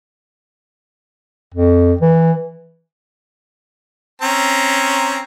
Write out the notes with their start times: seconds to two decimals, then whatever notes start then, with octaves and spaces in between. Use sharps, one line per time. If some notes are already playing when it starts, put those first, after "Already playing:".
1.54 F2
2.01 E3
4.22 C4 C#4 A#5